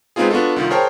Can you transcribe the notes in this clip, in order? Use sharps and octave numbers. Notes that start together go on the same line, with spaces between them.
G#3 B3 C4 D#4 F4 G#4
B3 D4 F4 F#4 A4
C2 D#3 F4
G#4 A#4 C5 C#5 G5 A5